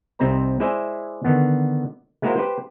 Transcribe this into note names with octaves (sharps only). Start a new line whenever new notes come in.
C2 C3 C4 D#4 C5 A#5
G#3 E4 C5 D5 E5 G#5
D3 D#3 B3
G#3 A#3 E4 F#4 A#4 C5
G4 B4 C5